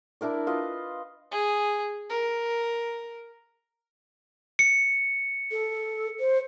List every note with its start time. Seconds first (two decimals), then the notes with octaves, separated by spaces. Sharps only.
0.21 D4 E4 A#4 D5
0.47 F4 B4 D#5
1.32 G#4
2.10 A#4
4.59 C#7
5.52 A4
6.20 C5